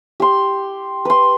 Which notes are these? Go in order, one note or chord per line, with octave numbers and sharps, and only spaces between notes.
G4 C6
B4 C6